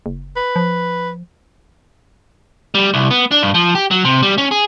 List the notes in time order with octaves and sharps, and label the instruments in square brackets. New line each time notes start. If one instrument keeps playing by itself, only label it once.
[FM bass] F#1
[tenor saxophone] B4
[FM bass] F3
[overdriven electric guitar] G3
C2
B3
D4
G2
F3
G4
F#3
C3
G3
C#4
G#4